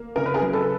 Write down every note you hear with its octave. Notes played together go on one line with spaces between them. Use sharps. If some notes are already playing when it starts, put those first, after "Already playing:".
Already playing: A#3
C#3 A#4
B4
G#4 A#4
F#3
A4 B4